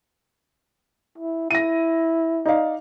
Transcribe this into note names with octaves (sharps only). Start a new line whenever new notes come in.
E4
E4 A#6 D#7
D#4 D5 F5